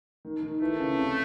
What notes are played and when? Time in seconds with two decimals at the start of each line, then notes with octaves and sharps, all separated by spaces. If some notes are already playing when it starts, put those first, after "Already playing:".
0.25 D#3
0.43 D#3
0.60 E3 A3
0.79 C#3
0.97 C3